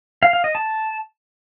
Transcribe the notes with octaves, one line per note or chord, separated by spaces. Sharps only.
F5
F5
D#5
A5